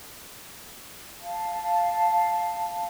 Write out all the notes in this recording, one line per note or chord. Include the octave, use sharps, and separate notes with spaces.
F5 A5